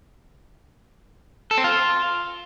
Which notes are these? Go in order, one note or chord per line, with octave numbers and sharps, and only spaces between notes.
A4
C4
F4